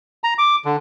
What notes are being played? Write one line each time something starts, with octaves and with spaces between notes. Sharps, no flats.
A#5
D6
D3